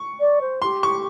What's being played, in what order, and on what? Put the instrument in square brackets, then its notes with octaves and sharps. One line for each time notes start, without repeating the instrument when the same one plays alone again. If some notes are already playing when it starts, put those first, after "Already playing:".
Already playing: [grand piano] C#6
[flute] D5
C5
[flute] G4 [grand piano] C6
[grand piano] C#6